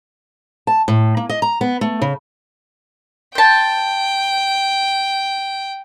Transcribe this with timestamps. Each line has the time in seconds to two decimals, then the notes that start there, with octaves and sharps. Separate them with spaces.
0.67 A5
0.88 A2
1.17 A#3
1.29 D#5
1.42 A#5
1.61 B3
1.81 A3
2.02 C#3
3.35 C5 G5 A5